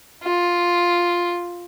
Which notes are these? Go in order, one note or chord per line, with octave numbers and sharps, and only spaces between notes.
F4